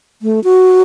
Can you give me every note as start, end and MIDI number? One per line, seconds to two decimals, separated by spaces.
0.22 0.43 57
0.44 0.82 66